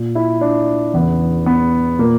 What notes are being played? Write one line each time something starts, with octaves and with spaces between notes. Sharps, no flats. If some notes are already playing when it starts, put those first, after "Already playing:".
Already playing: A#2
E4
D4
E2 C#3 E3 B3
B3
A#2 A#3